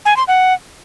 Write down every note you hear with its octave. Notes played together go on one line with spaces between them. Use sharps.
G#5
C6
F#5